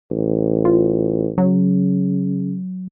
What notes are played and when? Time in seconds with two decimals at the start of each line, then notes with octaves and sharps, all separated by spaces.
0.10 A1
0.65 F4
1.38 C#3 F#3